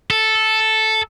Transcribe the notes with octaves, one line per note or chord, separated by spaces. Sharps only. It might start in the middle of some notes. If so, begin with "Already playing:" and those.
A4